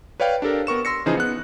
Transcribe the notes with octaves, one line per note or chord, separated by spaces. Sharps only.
B4 C#5 D5 F5 G5
D4 G4 A4 A#4
B3 A#4 C#6 E7
C6 E6 A#6 C#7
C#3 E3 F3 D#4 G#4 C5
B3 F#6